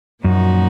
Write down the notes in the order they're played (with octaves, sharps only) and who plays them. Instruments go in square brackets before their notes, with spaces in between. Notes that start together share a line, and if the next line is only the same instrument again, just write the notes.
[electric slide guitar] F#2 [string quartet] A#2 F3 A#3 D#4 F#4